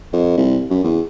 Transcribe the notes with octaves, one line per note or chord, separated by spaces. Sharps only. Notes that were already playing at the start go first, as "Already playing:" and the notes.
F2
C2
F#2
E2